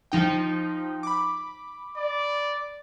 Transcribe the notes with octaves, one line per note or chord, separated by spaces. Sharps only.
F3 D#4 G5
B5 D6
D5